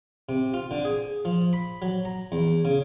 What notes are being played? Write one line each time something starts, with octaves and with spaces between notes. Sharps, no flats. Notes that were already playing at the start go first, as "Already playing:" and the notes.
C3
F4
D3
G#4
F3
B5
F#3
A#5
E2
C#3